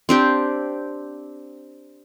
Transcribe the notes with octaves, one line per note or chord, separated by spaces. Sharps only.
C4 D4 G4